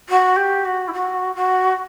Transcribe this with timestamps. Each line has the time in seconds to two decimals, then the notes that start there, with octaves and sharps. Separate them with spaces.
0.09 F#4
0.36 G4
0.64 F#4
0.87 E4
0.93 F#4
1.35 F#4